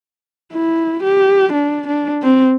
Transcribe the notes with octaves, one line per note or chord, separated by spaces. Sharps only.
E4
G4
D4
D4
C4